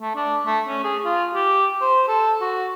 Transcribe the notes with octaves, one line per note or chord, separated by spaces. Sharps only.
A3
D4
A3
C#4
G#4
F4
G4
C5
A4
F#4